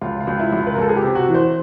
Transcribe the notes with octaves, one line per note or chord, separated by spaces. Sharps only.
C#2 F4
F4
C#2
E4
C#2
F4
B4
A#4
C#2 A4
G#4
G4
C3
F#4
E3
C5